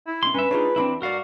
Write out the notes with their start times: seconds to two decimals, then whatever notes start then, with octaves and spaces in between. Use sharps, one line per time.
0.07 E4
0.23 B1 B2 C#4 C6
0.34 G2 C#4 B4 E5
0.51 D4 D#4 F4 G#4 C#5
0.76 E2 C4 D4 E4 B5
1.02 G2 F#4 A#4 D5 F5